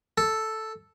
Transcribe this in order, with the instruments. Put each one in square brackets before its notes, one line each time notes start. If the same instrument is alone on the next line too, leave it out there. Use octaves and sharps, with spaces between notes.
[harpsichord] A4